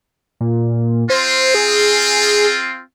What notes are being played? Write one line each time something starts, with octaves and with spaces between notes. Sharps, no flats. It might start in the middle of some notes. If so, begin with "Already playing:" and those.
A#2
C4 F4 C5
G#4